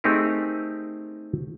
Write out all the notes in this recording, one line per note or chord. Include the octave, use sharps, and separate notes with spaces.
A3 C4 D#4 G4 G#4 A#4